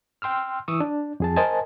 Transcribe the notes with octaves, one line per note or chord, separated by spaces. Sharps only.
G5 C6 E6 F6
E3 C#6 D#6 E6
D4
F2 G#4 A5
A#4 C5 D#5 G#5 A5